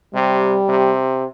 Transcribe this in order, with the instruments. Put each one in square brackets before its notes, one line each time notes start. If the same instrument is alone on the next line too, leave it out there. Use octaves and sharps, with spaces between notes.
[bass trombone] C3 [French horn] G3
[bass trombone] C3